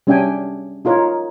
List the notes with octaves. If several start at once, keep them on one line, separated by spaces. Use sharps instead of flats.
G3 C#4 D4 E5 G5 G#5
D#4 F4 A#4 C#5